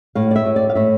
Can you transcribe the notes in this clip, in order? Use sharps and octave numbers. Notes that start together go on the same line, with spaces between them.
A2 F5
D5
E5
A2
D5
F5
A2 E5